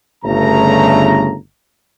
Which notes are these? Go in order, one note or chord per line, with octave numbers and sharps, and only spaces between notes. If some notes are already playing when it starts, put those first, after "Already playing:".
G1 C#3 A3 A#5